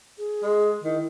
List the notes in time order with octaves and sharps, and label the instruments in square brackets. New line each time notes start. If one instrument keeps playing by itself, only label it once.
[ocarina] G#4
[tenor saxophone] G#3
[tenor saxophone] D#3 [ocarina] E4